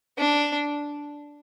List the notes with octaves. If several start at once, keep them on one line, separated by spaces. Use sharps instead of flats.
D4